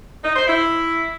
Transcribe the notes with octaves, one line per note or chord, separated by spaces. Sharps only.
D#4
C5
E4